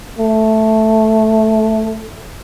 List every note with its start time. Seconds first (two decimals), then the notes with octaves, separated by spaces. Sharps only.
0.18 A3